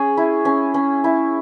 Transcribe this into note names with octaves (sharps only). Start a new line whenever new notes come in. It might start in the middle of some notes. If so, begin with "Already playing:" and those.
Already playing: C#4 G#4
E4
C#4
C#4
E4